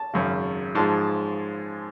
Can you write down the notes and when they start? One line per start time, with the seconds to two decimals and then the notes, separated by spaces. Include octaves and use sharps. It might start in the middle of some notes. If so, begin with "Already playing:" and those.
Already playing: A5
0.14 G#1 F#2 C#3
0.75 G#2 F3 G#3 A5